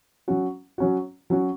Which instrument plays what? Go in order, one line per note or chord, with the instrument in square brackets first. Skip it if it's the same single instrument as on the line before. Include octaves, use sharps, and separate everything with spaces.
[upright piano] F#3 C#4 F#4
F#3 C#4 F#4
F#3 C#4 F#4